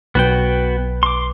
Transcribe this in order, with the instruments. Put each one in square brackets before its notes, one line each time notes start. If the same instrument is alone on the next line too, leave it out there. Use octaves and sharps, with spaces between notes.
[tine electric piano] B1 B4 [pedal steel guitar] B3 F#4 G5
[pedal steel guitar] C6 D6